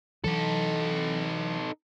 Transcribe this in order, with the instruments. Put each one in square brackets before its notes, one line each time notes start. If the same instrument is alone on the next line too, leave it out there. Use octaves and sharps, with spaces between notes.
[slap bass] E3 F#3 [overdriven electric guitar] D#4 A4